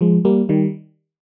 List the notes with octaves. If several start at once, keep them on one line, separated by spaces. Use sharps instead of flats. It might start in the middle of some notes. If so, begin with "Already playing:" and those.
F3 G#3
G3 A#3
D#3 G3